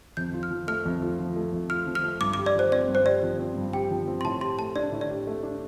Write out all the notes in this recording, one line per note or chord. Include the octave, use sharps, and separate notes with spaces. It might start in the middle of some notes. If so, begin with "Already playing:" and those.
F2 G6
F4
F6
F3
A3 F6
F2
F4
F3
A3
F2
F4 F6
F3
F6
A3
G2 D6
D6
G4
D5
F3 C5
C4 D5
G2
C5
G4 D5
F3
C4
G2
G4 G5
F3
C4
C6
A2 A5
G4 C6
A3 A5
D4 D5
A2
D5
G4
A3
D4